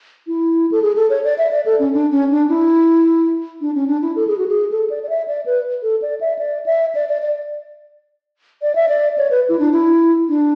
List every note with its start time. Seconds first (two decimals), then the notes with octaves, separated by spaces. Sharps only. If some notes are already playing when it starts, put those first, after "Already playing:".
0.27 E4
0.72 A4
0.82 G#4
0.96 A4
1.10 C#5
1.24 D5
1.38 E5
1.51 D5
1.66 A4
1.79 C#4
1.94 D4
2.12 C#4
2.30 D4
2.49 E4
3.61 D4
3.75 C#4
3.88 D4
4.02 E4
4.16 A4
4.27 G#4
4.38 F#4
4.48 G#4
4.71 A4
4.90 D5
5.03 D5
5.09 E5
5.28 D5
5.46 B4
5.83 A4
6.02 D5
6.21 E5
6.39 D5
6.66 E5
6.95 D5
7.09 D5
7.22 D5
8.62 D5
8.75 E5
8.89 D5
9.18 C#5
9.31 B4
9.49 E4
9.59 D4
9.72 E4
10.29 D4